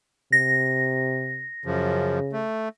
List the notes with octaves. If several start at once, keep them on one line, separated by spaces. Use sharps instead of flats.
C3 A#6
F#2 C#3 F3
A3